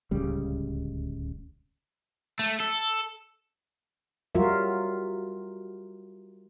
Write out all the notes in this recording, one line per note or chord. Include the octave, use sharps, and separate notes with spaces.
D1 C#2 C#3 G3
A3
A4
F#3 G3 F4 F#4 A#4 E5